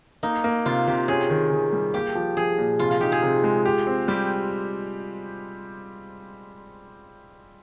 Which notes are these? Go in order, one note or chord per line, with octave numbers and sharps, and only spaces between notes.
A#3 D#4
A#3
C3 F4
C3 G4
C#4 G#4
D#3
D#3
G3
A#3 G4
F3
F3 G#4
A#2
C3 F4
F4
D#4 G4
G#4
C3
G#3
G4
C4
G3 G4